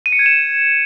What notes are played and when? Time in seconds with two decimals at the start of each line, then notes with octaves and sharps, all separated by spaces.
0.06 D#7
0.12 C#7
0.19 G#6
0.26 E7